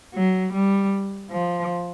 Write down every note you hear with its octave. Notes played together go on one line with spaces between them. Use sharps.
F#3
G3
F3